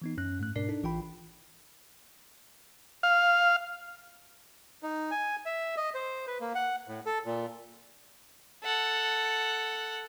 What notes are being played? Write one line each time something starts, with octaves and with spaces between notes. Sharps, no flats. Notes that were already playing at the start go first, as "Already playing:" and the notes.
E3 B3 D#4
F#2 C#4 F#6
G#2 A3 F#6
G#2 B2 D4 A#4 D5 C7
D4 D#4 A4
A1 E3 F4 G5 B5
F5
D#4
G#5
E5
D#5
C5
B4
A#3
F#5
A2
A4
A#2
A4 F#5